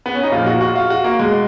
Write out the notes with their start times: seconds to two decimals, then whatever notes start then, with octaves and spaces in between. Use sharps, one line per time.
0.06 B3
0.15 C#4
0.23 D#4
0.32 A#2 F3 F4
0.46 F#4
0.61 F#4
0.75 F4
0.90 F#4
1.04 A#3
1.19 B2 G#3